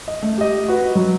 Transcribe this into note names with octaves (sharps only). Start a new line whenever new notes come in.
D#5
A3
G4 D#5
F#4 B4
F#3